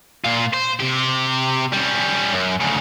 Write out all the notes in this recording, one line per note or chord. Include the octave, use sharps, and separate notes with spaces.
A#2 F4
C5
C3 G4
G3 C#4
F#2
D2 C#3